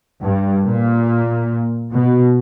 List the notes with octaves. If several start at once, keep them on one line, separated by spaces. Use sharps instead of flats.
G2
A#2
B2